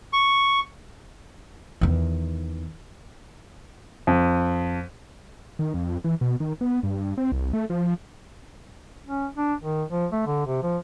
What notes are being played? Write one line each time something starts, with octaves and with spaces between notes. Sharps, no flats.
C#6
E2 D#3
F2
D#3
F2
E3
B2
D#3
B3
G2
C4
C2
A3
F3
C#4
D4
D#3
F3
A3
D3
C3
F3